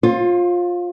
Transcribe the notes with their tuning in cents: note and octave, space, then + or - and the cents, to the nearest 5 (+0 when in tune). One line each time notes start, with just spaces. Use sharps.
F4 +15 C5 +45